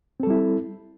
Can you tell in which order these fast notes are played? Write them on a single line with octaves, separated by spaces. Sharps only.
C4 A4 G3 E4